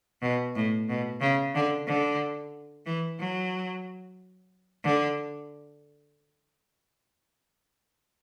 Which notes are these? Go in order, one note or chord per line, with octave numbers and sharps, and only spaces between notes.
B2
A2
B2
C#3
D3
D3
E3
F#3
D3